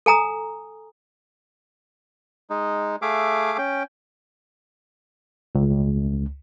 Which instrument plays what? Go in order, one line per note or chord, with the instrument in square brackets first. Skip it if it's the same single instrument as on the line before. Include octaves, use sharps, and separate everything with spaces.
[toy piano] A4 G#5 A#5 D#6
[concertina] G#3 D#4
A3 G#4 E5 F5 D6
C#4 G5
[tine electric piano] C#2